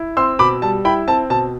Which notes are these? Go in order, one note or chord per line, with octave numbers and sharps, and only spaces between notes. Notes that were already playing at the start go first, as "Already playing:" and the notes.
Already playing: E4
C4 C6 E6
B2 B5 D6
G3 A5
E4 G5 B5
C4 A5
B2 A5